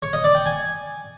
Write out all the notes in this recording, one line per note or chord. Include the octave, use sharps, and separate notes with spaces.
C#5
D#5
D5
G5
G#5